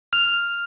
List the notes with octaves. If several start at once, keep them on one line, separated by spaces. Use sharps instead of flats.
F6 F7